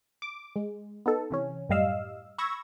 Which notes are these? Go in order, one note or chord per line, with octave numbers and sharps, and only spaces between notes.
D6
G#3
B3 D#4 A4
C3 E3 C#4
F#2 A2 G3 D#5 F5 E6
B5 C#6 E6 G#6 A#6